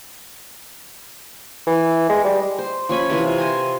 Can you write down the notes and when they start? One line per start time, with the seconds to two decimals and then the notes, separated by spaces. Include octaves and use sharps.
1.67 E3
2.09 G#3
2.24 G3
2.59 C5
2.89 F3 C#4 G#5 B5
3.10 C3 E3 F4 G#5
3.38 C5 D#5 G#5